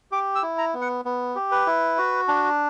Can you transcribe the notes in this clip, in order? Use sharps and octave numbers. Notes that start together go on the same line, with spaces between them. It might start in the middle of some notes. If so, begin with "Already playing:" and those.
G4 D6
E6
E4
A#5
B3
F#5
B3
G4
B4
E4
F#4
D4